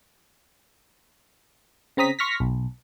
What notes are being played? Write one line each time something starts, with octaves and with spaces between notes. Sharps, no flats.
C#3 C4 A#5 D#6 B6
C6 C#6 F6 A#6 B6
B1